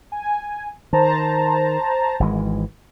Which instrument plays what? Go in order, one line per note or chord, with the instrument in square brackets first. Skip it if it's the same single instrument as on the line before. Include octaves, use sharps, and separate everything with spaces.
[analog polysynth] G#5
[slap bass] D#3 [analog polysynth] C5 A5 A#5
[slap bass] G#1 E3 G#3